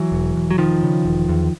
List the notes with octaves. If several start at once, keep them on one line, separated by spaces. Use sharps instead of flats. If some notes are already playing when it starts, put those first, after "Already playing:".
Already playing: E3 F#3
E1
E1
F#3
E1 D#3 F3
C#3
E1
E2